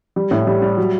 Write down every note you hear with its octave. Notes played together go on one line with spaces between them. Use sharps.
G3
A2
G3
G3
F#3